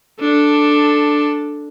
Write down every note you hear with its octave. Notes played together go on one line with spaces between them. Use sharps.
D4 A4